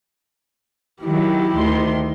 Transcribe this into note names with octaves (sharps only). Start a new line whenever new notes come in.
D#3 F#3 E4 G4
D2 D#3 C6